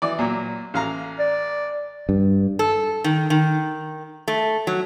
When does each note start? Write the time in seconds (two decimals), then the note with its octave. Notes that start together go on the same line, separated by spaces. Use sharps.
0.02 E3 D5
0.19 A#2 F#3
0.74 A1 F5 A#5
1.19 D5
2.09 G2
2.59 A4
3.04 D#3
3.30 D#3
4.28 A3
4.67 F#3